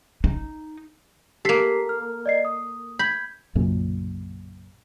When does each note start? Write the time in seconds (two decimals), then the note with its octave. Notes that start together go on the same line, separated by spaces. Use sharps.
0.24 D#4
1.45 A#3 G4 A4 B6 C7
1.89 F6
2.26 D5 D#5 C7
2.45 D#6
2.99 B5 G6 G#6
3.55 B1 F#2 A#2 C#3